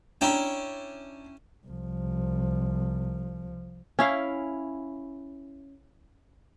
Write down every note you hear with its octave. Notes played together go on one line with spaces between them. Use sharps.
C#4 D4 E4 G5 A#5
C2 F3
C#4 E4 F5